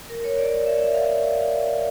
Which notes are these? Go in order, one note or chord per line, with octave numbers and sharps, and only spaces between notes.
A#4
C#5
D5
E5
F5